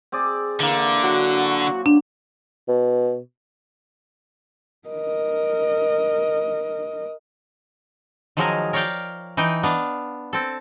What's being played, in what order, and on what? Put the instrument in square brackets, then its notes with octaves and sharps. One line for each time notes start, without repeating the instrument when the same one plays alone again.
[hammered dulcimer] C4 G#4 D5
[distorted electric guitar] D3 [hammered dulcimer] E3 A#3
[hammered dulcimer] F#3 [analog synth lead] F#4
[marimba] D4
[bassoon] B2
[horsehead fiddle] A#4 D#5
[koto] D#3 F3 F#3 G#3 G#4 A#4
A#4 C#5 D5 F5 G5
E3 D#4 G5
B3 D4 F5
C4 A4